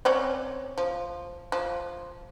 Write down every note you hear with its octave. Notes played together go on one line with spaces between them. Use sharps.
C4 C#4 D5
F3
F3